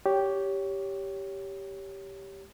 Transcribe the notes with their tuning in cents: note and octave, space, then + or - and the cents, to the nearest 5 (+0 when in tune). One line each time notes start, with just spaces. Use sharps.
G4 +0 C#5 +15